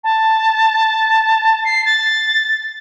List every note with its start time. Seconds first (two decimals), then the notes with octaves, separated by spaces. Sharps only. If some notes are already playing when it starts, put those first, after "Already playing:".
0.04 A5
1.65 C7
1.86 A6